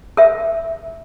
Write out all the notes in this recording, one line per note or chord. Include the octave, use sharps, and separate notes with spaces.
A#4 E5